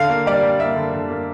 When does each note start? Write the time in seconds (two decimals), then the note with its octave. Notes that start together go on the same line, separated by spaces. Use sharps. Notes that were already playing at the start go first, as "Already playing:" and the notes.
Already playing: D3 F5
0.10 A#3
0.26 G3 D5
0.43 G3
0.60 A#3 E5
0.76 D3
0.94 D3
1.10 A#3